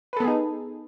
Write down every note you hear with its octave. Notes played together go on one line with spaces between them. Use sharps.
B3 D#4 G#4 A4 B4